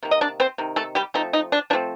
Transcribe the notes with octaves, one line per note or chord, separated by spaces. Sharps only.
C3 D#3 A#3
D#5
D4 D5
C4 C5
C3 D#3
A3 A4
G3 G4
F3 A3 C4 D#4
D#4
D4
F3 A3 C4 D4